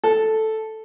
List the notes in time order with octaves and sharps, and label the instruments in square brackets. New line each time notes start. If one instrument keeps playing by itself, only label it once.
[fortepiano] A4